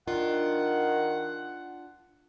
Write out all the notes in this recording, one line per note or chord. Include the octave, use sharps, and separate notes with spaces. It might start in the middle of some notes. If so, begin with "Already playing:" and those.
D#3 D4 F4 F#5